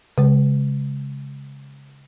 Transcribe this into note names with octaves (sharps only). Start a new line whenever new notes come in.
C#3 G#3